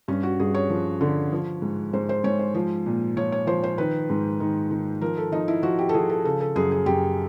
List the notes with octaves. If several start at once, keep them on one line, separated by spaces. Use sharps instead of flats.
G2 C#4
F#4
G2 G#4
C#5
F3
D3
F3
G#2
G#2 C5
C5
G#2 C#5
C5
F3
A#2
F3 C#5
C#5
F3 C5
C5
D#3 B4
G#2
D#3
D#3
F3 A#4
A4
F3 D#4
E4
F3 F#4
G4
A4
F3 G#4
A4
C#3 A4
A4
F#2 G#4
G#4
F#2 G4